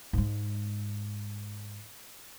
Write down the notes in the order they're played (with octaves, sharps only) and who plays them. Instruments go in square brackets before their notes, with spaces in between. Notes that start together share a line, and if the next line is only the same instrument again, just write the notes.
[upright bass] G#2 G#3